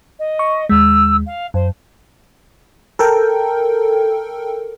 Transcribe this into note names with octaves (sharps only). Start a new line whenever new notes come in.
D#5
C#6
D#2 G#3 E6
F5
F#2 C5
A4 A#4 G5